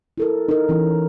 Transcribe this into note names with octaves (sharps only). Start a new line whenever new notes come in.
E4 A4 A#4
D#4 A#4
E3 C#4